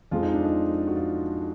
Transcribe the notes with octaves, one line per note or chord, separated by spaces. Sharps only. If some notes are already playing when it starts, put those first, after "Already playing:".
F2 F3 G#3 F4
D#4
D4
D#4
F#4
F4